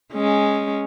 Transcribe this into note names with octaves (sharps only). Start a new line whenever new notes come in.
G#3 C#4